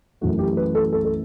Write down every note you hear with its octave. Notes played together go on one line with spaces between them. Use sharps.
F#2 E3 A3 F#4
G4
B4
A4
A4
A4